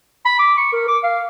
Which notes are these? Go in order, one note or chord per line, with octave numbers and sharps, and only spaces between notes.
B5
D6
C#6
A#4
D6
F5